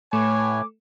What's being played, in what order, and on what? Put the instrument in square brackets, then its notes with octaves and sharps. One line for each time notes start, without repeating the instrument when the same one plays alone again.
[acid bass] A2 [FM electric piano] A3 [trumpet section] B4 C#5 G#5 [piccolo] D6